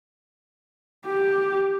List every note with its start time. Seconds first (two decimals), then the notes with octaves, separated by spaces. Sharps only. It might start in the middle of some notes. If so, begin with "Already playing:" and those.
1.06 G4